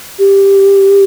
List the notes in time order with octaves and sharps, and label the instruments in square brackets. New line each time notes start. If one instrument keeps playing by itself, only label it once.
[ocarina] G4